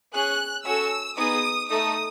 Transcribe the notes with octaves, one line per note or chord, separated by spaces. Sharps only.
C#4 G#4 F#6
C#4 F#4 A4 E6
B3 D#4 G#4 D#6
A3 D#4 A4 D#6